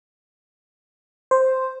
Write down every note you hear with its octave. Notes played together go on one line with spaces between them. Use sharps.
C5